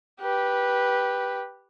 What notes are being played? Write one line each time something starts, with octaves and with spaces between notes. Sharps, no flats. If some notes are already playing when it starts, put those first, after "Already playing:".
G4 B4